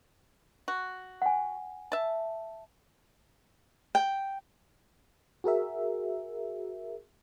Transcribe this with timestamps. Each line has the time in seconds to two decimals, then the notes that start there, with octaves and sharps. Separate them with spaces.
0.68 F#4
1.22 F#5 G#5
1.92 E5 A5
3.95 G5
5.44 F#4 G#4 A#4 E5